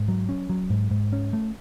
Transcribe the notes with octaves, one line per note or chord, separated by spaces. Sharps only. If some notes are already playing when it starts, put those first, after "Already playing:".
Already playing: G#2
F#3
C#4
F#3
G#2
G#2
C#4
A3